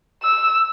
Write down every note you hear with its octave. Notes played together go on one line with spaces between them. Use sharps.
E6